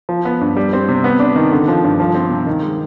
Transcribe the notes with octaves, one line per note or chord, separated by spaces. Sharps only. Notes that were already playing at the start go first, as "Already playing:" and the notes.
F3
B3
G2
G3
C4
C3
B3
D4
D#3
D3
F3
G2
F3
C4
C3
D#3
G#3